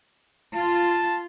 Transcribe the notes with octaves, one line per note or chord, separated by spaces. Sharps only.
F4 A5